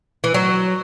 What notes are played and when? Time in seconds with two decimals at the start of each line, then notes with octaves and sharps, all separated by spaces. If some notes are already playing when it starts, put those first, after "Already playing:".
0.24 E3
0.34 F#3